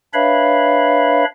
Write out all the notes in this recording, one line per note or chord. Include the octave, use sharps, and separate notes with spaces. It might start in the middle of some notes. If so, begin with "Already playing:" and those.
D4 B4 C#5 E5 F5 B5